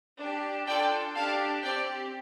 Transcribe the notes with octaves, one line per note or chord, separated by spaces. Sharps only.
D4 G4
D4 F4 A4 D5 G5
D4 G4 F5 A5
C4 G4 D5 G5